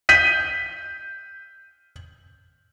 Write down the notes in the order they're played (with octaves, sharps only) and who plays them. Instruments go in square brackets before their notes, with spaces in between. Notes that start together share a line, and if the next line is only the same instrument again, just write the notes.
[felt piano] G6 B6 D#7